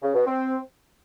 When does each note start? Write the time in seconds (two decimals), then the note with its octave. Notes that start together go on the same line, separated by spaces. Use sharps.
0.03 C#3
0.15 B2
0.26 C4